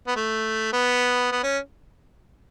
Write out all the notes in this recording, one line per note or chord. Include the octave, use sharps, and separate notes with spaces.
B3
A3
B3
B3
C#4